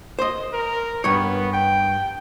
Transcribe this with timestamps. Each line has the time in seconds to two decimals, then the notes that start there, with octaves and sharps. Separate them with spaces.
0.19 C5 D#5
0.53 A#4
1.04 G2 B3 C#5
1.53 G5